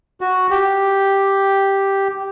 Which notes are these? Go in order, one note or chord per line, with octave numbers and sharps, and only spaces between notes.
F#4
G4